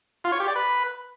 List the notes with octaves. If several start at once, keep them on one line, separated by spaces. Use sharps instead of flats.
F4
C#5
G4
D5
B4